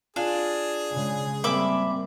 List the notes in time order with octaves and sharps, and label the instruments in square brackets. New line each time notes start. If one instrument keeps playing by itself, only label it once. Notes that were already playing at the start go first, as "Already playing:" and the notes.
[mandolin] D4 [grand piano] F4 [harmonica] G#4
[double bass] C#3 G#3
[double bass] G3 C4 [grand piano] A#3 [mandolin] E5 B5 D6